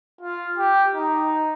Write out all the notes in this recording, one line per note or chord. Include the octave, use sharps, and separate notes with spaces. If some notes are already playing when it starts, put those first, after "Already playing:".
F4
G4
D#4